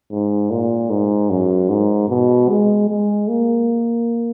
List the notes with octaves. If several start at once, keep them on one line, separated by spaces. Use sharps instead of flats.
G#2
A#2
G#2
F#2
G#2
B2
G#3
G#3
A#3